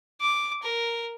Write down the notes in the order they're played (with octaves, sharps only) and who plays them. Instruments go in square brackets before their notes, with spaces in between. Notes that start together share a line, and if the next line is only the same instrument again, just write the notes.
[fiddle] D6
A#4